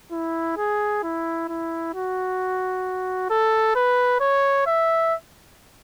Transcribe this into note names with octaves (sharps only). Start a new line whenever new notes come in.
E4
G#4
E4
E4
F#4
A4
B4
C#5
E5